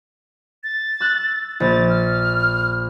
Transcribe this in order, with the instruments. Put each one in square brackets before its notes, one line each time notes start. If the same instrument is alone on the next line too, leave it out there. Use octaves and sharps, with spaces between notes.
[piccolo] A6
[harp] E6 F#6
[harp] A#1 [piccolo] A6
[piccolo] F6